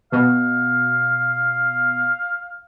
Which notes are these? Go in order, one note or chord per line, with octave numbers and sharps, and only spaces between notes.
B2 F5